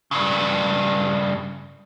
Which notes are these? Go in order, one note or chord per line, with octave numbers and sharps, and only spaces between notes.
G2 C#3